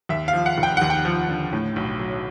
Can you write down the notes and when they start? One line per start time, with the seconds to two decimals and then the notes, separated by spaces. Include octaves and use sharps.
0.09 D#2 E5
0.28 F5
0.33 F3
0.46 F#5
0.58 F1
0.63 G5
0.77 D#2 F#5
0.90 G5
1.05 F3
1.29 D3
1.53 A2
1.76 B1
2.00 F#3